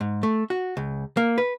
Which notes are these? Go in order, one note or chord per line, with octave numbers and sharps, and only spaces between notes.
G#2
A3
F#4
C#2
A#3
B4